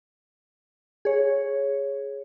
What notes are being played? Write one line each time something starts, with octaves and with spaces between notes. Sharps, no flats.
G#4 C#5